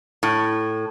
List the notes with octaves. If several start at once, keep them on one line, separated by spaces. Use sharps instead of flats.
A2